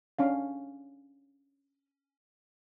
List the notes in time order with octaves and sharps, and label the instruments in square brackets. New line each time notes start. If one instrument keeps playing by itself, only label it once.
[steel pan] C#4 D4 F5